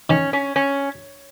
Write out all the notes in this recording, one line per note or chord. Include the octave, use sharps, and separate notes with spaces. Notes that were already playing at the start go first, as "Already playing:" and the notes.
D#3 C#4
C#4
C#4